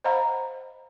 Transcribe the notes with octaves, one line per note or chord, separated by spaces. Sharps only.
C5 D#5 F5 F#5 A#5 B5